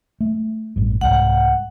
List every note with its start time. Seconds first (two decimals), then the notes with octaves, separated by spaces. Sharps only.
0.20 A3
0.76 A1 G2
1.01 C2 G#2 F#5